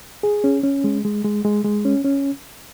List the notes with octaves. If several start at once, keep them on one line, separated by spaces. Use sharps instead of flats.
G#4
C#4
C#4
G#3
G#3
G#3
G#3
G#3
C#4
C#4